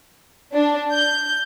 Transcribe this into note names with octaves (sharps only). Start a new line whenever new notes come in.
D4
G6